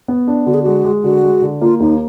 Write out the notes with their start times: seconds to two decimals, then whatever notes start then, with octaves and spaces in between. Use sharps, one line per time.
0.08 B3
0.28 D4
0.46 D3 F#4
0.54 G#4
0.62 G#3 F#4
0.85 G#3
1.04 D3 F#4
1.23 G#3
1.42 D3
1.61 A#3 F4
1.80 D#2 D#4